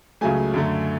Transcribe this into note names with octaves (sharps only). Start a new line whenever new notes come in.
C#2 C#3 F#3 A3 G#5
F#2 D3 A3